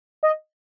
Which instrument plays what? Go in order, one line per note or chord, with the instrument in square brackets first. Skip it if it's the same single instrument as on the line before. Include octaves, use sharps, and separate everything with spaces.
[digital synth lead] D#5